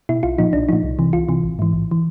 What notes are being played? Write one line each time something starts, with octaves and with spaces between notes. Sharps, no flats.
B2 E4
B1 F4
A#2 F3 D#4
B1 D4
A#2 F3 D#4
C2
C3 E3
C2 F4
C3 E3
A1
G#2 E3
A1
E3